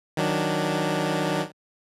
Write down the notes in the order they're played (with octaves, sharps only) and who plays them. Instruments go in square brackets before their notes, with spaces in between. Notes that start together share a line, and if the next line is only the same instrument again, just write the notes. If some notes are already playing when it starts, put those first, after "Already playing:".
[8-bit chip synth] D#3 F#3 D4